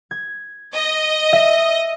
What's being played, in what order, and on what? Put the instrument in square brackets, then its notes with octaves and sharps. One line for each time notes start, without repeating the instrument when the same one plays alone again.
[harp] G#6
[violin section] D#5
[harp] E5